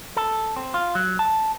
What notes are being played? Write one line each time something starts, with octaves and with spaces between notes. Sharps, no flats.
A4
C4
F4
F#3
A5